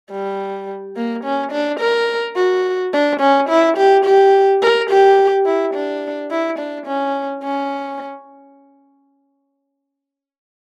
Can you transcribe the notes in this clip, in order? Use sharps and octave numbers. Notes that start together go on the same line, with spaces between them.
G3
A#3
C#4
D4
A#4
F#4
D4
C#4
E4
G4
G4
A#4
G4
E4
D4
E4
D4
C#4
C#4